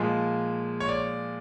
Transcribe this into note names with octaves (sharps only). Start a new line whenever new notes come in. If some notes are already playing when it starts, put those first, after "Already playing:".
Already playing: A#2 F3 G#3
C#5
D5